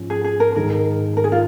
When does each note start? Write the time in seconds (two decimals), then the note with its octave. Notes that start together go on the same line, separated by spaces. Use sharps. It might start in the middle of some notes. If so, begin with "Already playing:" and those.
Already playing: G#2 F3 C#4 F4
0.10 G#4
0.24 G#4
0.40 A#4
0.56 G#2 D#3 G#3 A#4
1.17 A#4
1.24 G#4
1.32 F4